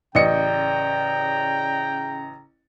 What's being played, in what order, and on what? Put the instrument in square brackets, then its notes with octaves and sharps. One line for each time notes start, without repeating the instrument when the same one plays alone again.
[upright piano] A1 D#5 C#7 [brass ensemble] C#3 A#5 [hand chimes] D5 [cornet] G5